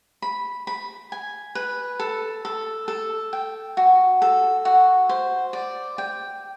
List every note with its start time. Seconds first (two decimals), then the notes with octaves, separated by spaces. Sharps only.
0.22 B5
0.67 B5
1.12 G#5
1.55 B4
2.00 A4
2.45 A4
2.88 A4
3.33 G5
3.77 F#4
4.22 A4
4.65 F#4
5.09 C5
5.53 D5
5.98 G5